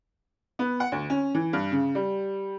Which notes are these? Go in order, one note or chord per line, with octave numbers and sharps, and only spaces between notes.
B3
F#5
D2
C#4
E3
G2
C#3
G3